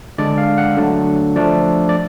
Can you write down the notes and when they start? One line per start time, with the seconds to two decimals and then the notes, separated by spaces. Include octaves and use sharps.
0.18 D3 G#3 D4 D5
0.38 F5
0.58 F#5
0.77 D3 F#3 A3 D4
1.36 F3 A3 D4 D5
1.89 D5